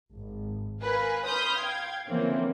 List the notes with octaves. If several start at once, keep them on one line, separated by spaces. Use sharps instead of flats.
G#1
A#4 B4 F5 G#5
B4 B5 C6 D#6 F6 G6
F5 G5 G#6
D3 E3 F3 A#3 C4 C#4